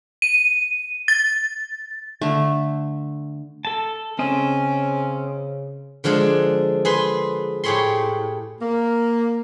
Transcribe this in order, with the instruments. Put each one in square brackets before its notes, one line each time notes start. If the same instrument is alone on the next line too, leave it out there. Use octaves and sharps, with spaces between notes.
[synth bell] D#7
A6
[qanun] D3 A3
[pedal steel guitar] A4 A5
[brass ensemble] C#3 [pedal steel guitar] C4 D#5 [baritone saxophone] C#4
[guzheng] D3 F3 G#3 D4 G#4
G#4 B4 C6
A2 G4 G#4 C#5 B5 C6
[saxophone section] A#3